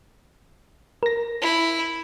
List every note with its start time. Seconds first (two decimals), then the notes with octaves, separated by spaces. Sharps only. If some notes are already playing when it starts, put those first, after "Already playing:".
1.03 A#4 A#6
1.42 E4